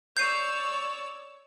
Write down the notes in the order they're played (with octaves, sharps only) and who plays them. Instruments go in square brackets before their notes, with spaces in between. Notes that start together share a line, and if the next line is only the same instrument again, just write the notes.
[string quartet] C#5 D5 E6 [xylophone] G6 C7 D#7